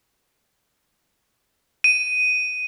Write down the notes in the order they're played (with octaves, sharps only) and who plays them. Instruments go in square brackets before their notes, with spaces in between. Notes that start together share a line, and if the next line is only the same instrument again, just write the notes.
[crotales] D#7